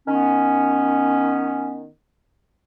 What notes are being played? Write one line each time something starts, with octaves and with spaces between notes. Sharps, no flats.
D#3 B3 C#4